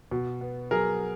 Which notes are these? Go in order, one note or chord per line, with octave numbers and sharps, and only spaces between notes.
B2
B3
F#3 G#4 A#4